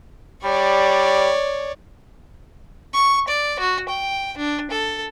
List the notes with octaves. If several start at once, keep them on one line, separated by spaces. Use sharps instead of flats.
G3 C#5 D5
C#6
D5
F#4
G5
D4
A4